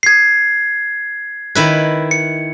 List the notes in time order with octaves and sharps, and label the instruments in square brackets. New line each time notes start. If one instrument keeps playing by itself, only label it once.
[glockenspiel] G#6 C7
[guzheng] D#3 E4 B4
[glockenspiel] C#7